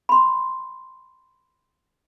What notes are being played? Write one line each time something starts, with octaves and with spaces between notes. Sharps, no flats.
B5 C6